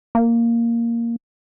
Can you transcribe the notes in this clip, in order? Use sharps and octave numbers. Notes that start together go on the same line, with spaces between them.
A#3